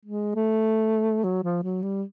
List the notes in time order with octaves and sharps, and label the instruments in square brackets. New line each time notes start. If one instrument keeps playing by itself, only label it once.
[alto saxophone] G#3
A3
F#3
F3
F#3
G3